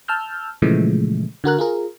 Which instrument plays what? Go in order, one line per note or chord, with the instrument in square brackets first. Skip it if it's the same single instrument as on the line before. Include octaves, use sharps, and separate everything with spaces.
[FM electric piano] A5 E6 F6 G6
A#2 C#3 E3 F3 G#3 A3
D3 F#4 A#4 F#6
F4 G#4 A#4